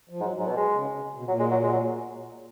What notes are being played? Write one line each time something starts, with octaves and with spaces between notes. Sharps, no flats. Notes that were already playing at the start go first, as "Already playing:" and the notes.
F3
G#2 F#3
G#2 F#3
B2
G#3
C#3
C#3
B2
A#2 F#3
G#3
F#3
G#3
F#3